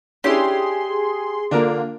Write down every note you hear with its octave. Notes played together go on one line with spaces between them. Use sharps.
C#4 D4 E4 G4 G#4 C6
D3 A#3 D4 F4 A#4